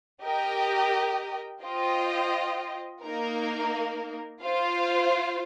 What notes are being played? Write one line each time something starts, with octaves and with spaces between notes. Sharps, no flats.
G4 A#4 D#5 G5
F4 C5 D#5 G5
A#3 D#4 A#4
F4 C5 F5